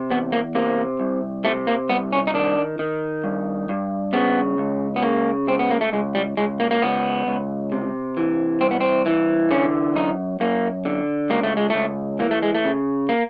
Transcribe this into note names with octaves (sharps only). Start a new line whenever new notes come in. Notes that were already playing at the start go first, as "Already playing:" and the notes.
Already playing: C3
E2 B3
A#3
C3 A#3
C2
C3 A3
A#3
C2 B3
C#4
D#4
D#3 D4
D#3
G2
G2
C#3 B3
C#2
B3
C#3 A#3
C#2 C4
B3
A#3
A3
C#2 G#3
G3
C#2 G#3
A#3
A#3
C#2 B3
C#2
C3
E3
C2 C4
B3
C4
E3
D3 C#4
F#2 D#4
F#2 A#3
D3
C#2 A#3
A3
G#3
C#2 A3
E3 A#3
A3
G#3
A3
C#3
A#3